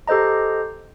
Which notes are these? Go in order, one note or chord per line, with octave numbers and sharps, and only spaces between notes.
G4 A4 C5 D#5 A#5